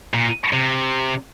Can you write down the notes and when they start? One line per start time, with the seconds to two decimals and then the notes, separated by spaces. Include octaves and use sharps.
0.14 A#2
0.53 C3